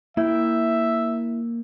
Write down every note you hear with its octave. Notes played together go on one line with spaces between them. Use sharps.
A#3 E4 E5 G5